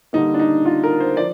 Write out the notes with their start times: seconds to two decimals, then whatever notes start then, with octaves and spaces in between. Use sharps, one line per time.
0.13 D3 G3 A#3 D#4
0.34 D4
0.39 D#4
0.66 F4
0.83 A#4
1.00 C5
1.17 F3 D5